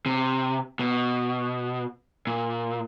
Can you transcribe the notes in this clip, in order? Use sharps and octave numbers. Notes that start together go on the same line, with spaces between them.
C3
B2
A#2